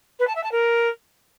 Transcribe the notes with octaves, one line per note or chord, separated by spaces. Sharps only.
B4
A5
E5
A5
A#4